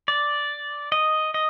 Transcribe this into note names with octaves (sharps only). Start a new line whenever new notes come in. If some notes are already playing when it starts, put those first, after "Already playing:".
D5
D#5
D#5